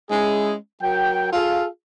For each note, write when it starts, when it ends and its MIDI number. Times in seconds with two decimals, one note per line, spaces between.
0.10 0.55 56
0.10 0.55 61
0.10 0.55 64
0.10 0.55 68
0.82 1.32 54
0.82 1.32 70
0.82 1.32 79
1.33 1.66 65
1.33 1.66 68
1.33 1.66 69
1.33 1.66 77